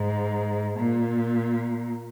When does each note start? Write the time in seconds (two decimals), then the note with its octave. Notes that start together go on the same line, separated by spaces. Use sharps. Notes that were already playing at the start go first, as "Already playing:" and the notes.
Already playing: G#2
0.79 A#2